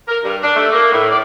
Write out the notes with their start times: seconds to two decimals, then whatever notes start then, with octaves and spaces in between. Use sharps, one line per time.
0.08 A#4
0.23 G2
0.42 D4
0.56 A3
0.73 A#3
0.92 A2
1.11 D5